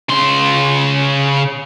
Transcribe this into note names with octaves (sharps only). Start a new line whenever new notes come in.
C#3 C6